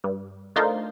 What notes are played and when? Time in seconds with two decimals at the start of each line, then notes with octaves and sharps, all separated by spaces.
0.04 G2
0.56 A3 D4 D#4 F4 A#4 C5